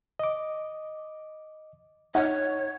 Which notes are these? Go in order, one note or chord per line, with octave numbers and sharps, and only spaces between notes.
D#5 D6
D#4 C#5 F#5